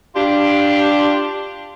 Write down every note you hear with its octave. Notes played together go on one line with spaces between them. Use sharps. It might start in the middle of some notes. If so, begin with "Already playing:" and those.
D4 F4 G4